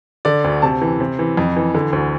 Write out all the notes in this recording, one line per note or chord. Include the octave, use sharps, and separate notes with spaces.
D3 D5
D2
C3 A5
E3
C3
E3
F2
E3
D3
D2